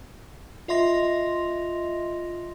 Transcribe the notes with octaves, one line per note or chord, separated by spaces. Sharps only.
F4 D#5 E5 C6 A#6 F7